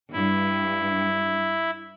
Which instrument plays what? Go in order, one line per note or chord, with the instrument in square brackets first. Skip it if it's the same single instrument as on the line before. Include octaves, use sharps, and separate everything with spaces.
[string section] G2 [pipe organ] E4